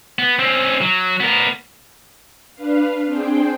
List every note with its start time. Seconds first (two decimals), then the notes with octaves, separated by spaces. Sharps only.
0.19 B3
0.39 C4 C#4
0.81 F#3
1.20 B3 A#4
2.55 D4 B4 F5
3.06 C4 D4 G#4 C5 G5